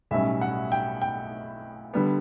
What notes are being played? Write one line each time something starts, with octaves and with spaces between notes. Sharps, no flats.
B1 A2 G3 C#4 E5
F#5
G5
G5
D3 G3 B3